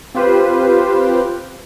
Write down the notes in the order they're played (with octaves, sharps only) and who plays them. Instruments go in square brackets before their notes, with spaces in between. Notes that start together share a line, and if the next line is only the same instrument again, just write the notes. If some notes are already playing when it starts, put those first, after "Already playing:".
[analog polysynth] C4 F4 G4 B4 C5